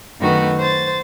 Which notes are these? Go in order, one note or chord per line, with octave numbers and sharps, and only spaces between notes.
F#2 D#3 A3 B3 F#4
C5 A6